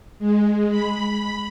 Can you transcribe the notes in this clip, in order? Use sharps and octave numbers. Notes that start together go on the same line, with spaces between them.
G#3
B5